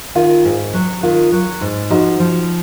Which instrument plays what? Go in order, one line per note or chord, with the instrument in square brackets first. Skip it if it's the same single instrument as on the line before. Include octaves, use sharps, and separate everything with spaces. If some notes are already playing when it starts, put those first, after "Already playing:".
[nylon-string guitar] D#3 [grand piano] F4
[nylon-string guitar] G#2
F#3
[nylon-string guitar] D#3 [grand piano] F4
[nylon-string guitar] F#3
G#2
[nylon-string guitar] F3 [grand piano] D#4 F#4
[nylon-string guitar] F3